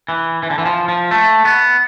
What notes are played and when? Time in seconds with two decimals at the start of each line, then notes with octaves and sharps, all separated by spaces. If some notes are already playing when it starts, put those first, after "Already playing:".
0.09 E3
0.43 E3
0.50 D3
0.58 E3
0.66 F3
0.88 F3
1.11 A3
1.45 B3